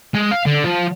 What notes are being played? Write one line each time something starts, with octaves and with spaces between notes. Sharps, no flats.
G#3
F5
D3
F3